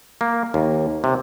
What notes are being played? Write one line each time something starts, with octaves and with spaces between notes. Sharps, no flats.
A#3
D#2
C3